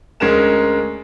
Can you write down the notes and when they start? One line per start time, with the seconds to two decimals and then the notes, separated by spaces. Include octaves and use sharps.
0.20 D2 G#3 C#4 A#4 A#5 E7